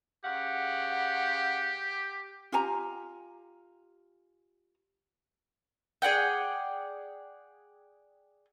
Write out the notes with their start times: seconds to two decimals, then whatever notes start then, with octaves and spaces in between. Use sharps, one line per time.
0.25 C#3 G4 F5 F#5
2.52 F4 G4 G#5 A#5
6.02 G#4 D5 F#5 G5